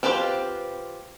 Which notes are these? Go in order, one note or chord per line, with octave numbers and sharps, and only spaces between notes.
C4 F4 G4 B4 C5